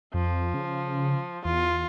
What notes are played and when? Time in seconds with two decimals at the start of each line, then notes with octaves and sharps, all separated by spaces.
0.14 F2 F3
0.54 C#3
1.45 E2 F4